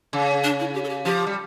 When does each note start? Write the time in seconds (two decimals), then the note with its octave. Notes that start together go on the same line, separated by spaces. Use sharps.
0.13 C#3
0.44 D4
0.60 E4
0.74 G4
0.84 A4
0.89 G4
1.05 F3 G4
1.27 G3